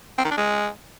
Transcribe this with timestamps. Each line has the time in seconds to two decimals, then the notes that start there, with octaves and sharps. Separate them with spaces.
0.18 C4
0.25 D#3
0.31 D4
0.38 G#3